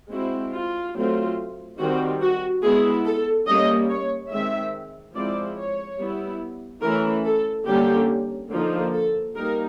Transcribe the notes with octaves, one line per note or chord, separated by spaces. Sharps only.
G#3 C4 E4 F#4
F4
F#3 A3 C4 F4
D#3 G3 C4 F#4
F#4
G#3 B3 E4 G#4
A4
G3 A#3 C#4 D#5
C#5
D#3 G#3 C4 E5
F3 G#3 C4 E4 D5
C#5
G3 B3 E4
E3 A3 C#4 E4 A#4
A4
D3 G3 A#3 C#4 G4
D3 F3 A#3 D#4
A4
G3 A#3 D#4 A#4